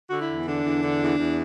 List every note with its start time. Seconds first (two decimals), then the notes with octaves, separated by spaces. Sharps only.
0.09 D3 F#4
0.20 E4
0.29 E2
0.47 D3 D4
0.64 E2
0.82 D3
1.00 E2
1.17 E2